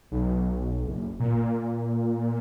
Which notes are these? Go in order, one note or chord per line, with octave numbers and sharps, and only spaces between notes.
B1
F#1
A#2